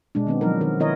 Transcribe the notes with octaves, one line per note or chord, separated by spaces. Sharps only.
B2 G#3 D4
D#3 B3 C4
F3 F#3 D#4 A#4
D#3 A#4
D#3 B3 E4 A#4 C#5 D#5